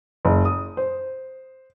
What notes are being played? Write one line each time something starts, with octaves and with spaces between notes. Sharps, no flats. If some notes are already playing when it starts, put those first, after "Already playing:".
F#1
D#6
C5